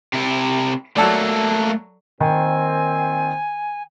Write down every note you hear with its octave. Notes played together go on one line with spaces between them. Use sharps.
C3 E4
F#3 A3 A#3 A4 D5
A#2 D#3 C4 G#5